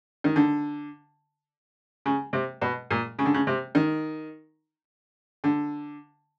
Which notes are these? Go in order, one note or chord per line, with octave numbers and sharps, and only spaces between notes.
D#3
D3
C#3
C3
B2
A#2
C#3
D3
C#3
C3
D#3
D3